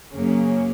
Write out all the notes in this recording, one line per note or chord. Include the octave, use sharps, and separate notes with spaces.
F#2 C#3 F#3 A#3 C#4